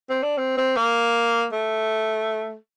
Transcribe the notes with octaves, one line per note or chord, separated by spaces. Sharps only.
C4
D4
C4
C4
A#3
A3